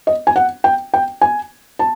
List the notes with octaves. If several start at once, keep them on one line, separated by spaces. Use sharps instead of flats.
D#5
G#5
F#5
G5
G5
G#5
A5